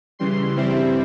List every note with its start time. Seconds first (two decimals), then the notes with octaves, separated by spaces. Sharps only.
0.19 C#3 E3 G3 C6
0.56 G2 G3 C4 E4